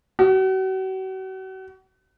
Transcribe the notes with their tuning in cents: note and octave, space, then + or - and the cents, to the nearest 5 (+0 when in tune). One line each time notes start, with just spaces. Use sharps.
F#4 +40